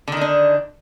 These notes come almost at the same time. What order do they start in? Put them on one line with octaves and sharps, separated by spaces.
D3 D#3 D#4 D4